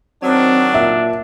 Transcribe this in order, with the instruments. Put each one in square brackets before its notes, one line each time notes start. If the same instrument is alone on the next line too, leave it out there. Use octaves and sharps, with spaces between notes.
[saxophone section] D#3 F#3 [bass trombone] C4 [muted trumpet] D4
[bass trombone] A#2 [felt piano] E5